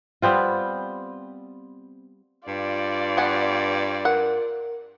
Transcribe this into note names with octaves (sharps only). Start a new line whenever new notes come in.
G3 B3 C4 F4
G2 F4 D5
B3 F#5 G#5
A#4 F#5